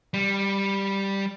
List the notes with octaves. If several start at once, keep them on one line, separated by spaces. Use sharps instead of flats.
G3